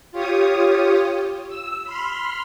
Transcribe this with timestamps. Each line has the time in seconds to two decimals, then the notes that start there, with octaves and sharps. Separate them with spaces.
0.11 F4 G4 C#5 D#6
1.48 E6
1.84 B5 C6 F6